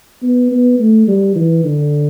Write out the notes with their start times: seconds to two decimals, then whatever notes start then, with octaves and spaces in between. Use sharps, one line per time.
0.23 B3
0.51 B3
0.79 A3
1.08 G3
1.36 E3
1.64 D3